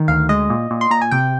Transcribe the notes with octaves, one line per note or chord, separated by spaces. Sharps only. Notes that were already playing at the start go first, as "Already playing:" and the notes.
Already playing: D#3
D2 F5
G#3 D#5
A#2
A#2
C6
A#2 A#5
G#5
C3 G5